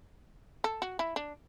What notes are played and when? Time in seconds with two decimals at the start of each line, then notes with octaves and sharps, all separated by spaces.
0.64 A4
0.82 F#4
0.99 E4
1.16 D4